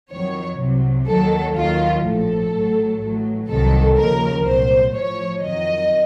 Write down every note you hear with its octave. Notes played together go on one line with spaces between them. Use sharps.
F2 D#3 F#3 C#5
C2 C3 F#3
D#2 D#3 F#3 A4
D#2 D#3 F#3 F4
A#1 A2 F3 A4
A1 A2 F#3
A1 A2 F#3
C2 C3 D#3 F#3 A4
D#2 C#3 F3 A#4
C2 A#2 F#3 C5
A1 A2 F3 C#5
F2 D#3 F#3 D#5